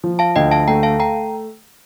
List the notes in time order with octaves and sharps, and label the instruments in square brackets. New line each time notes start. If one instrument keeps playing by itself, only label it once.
[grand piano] F3
[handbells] F5 A5
[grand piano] D2 [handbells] D#5 G5
[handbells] F5 A5
[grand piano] A3 [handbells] G5 A#5
[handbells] F5 A5
G5 A#5